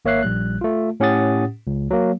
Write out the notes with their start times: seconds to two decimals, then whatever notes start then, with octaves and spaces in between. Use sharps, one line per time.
0.05 G#1 A#3 C#5 E5 F#6 C7
0.23 A#1 G3 F#6
0.61 A3 F4
1.00 A2 C#4 G4 F#5 D#6 A6
1.67 C#2
1.91 F#3 A#3